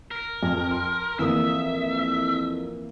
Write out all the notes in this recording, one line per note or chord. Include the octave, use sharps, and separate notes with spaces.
A#4
F2
C6
F2 E3 A#3 E5 D#6